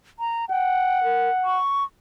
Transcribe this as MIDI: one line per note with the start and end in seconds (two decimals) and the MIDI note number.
0.19 0.45 82
0.50 1.59 78
0.50 1.03 79
1.04 1.29 70
1.45 1.84 85